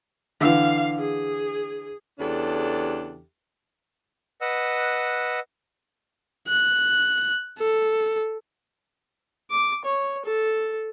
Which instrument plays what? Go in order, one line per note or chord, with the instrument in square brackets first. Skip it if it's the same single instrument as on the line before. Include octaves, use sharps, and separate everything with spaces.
[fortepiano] D3 E3 [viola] F5
[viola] G#4
[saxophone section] E2 C#3 D4 G4 A4
[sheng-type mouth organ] B4 D#5 F#5 E6
[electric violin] F#6
A4
[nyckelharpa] D6
C#5
A4